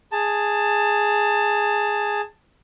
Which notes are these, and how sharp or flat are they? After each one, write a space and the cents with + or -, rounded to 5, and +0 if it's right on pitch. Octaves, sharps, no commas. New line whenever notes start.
G#4 +0 A5 +15